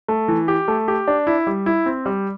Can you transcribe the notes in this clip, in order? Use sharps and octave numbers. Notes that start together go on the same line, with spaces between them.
A3
E3
G4
A3
G4
D4
E4
G3
E4
C4
G3